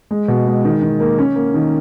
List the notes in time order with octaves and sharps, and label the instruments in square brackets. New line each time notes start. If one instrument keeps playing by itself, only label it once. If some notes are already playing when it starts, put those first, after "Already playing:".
[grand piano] G#3
B2
G#3
D#3
D#3
A#3
C#4
A#3
D#3